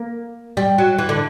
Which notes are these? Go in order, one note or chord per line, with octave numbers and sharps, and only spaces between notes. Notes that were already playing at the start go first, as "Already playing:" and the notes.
Already playing: A#3
G3
F#3
E3
D3